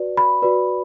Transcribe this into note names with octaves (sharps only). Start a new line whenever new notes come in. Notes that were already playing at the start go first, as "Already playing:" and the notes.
Already playing: F#4 B4 D5
B5
F#4 B4 D5